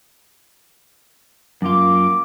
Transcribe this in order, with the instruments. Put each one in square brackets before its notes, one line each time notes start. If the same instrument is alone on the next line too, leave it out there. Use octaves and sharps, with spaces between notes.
[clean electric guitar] F#2 F4 [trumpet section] A#3 D6